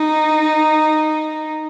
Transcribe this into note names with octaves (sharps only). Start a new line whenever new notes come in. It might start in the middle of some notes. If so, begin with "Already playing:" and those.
Already playing: D#4